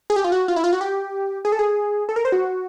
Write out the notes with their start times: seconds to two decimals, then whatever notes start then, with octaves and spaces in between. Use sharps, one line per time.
0.10 G#4
0.16 G4
0.24 F4
0.32 F#4
0.48 F4
0.56 E4
0.64 F4
0.73 F#4
0.81 G4
1.45 G#4
1.52 A4
1.59 G#4
2.09 A4
2.16 A#4
2.25 C5
2.32 F#4